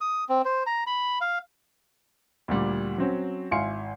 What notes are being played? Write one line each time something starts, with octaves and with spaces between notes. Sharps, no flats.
D#6
C4
C5
A#5
B5
F5
D2 A#2 G3
F#3 C4 C#4
G#1 E4 F5 G#5 C6 C#7